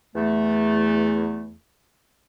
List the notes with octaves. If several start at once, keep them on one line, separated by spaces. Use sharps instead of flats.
E2 A3